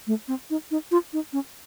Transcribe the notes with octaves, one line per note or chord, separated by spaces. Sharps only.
A3
C4
D#4
D#4
F4
D#4
C#4